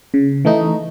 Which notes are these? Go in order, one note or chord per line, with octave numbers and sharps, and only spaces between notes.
C#3
E3 A3 D#4